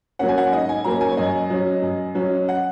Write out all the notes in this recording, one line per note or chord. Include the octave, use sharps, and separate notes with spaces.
F#3 A#3 C#4 F#5
G#5
F#5
G#2 D#5
G#5
F#3 A#3 C#4 A#5
G#5
C#5
F#2 D#5
F#3 C#4
F#2
F#3 C#4
F#5